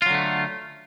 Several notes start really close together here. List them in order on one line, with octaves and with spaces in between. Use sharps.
F4 F#3 D3 A3